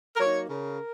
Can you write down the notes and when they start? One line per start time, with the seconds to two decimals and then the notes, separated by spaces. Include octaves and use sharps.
0.16 A#4
0.20 F#3 A#3 D#4 C#5
0.49 C#3 A#4